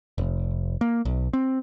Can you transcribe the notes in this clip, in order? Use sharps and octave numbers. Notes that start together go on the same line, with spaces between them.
F1
A#3
B1
C4